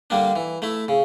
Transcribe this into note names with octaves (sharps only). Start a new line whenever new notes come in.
D3 G3 A#3 D4
E3
A3 E4
C#3